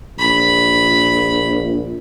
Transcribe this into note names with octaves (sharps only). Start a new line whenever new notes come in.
A#1 B5